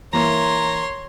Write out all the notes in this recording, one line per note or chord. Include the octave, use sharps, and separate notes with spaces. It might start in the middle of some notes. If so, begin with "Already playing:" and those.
E3 A#3 C#5 A#5 C6